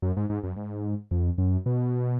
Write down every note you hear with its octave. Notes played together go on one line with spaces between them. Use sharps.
F#2
G#2
G#2
F#2
G#2
F2
F#2
B2